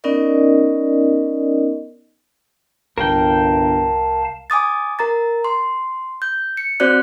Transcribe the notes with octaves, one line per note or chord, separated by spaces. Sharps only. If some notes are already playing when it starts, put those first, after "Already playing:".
B3 C#4 D#4 A#4 D5 D#5
G1 C2 A#4 F5 G5 A5
G#5 D6 D#6 A6
A#4 A#5 A6
C6
G6
C#7
C4 F#4 C5 D5 F#6